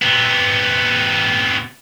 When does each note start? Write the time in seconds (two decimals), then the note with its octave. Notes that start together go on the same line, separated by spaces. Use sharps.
0.02 C3 B3